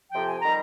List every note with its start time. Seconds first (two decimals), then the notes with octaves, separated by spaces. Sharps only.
0.12 F2 C3 F3 G5
0.27 G#5
0.42 D#3 G3 A#5